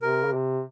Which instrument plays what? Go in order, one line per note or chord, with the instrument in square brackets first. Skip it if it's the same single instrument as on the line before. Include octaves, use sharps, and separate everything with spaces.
[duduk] C3 [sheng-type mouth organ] A#4
[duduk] C#3
C3